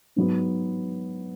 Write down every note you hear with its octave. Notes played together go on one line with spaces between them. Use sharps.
G#2 F#3 B3